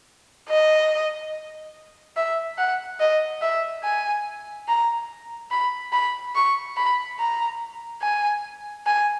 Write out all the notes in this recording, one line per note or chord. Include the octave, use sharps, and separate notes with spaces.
D#5
E5
F#5
D#5
E5
G#5
A#5
B5
B5
C#6
B5
A#5
G#5
G#5